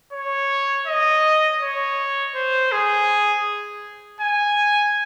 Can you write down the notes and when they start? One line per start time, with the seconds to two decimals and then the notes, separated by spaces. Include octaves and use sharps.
0.13 C#5
0.87 D#5
1.62 C#5
2.35 C5
2.72 G#4
4.21 G#5